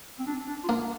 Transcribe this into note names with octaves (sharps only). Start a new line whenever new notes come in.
C4
D4
D4
F4
A#3 D4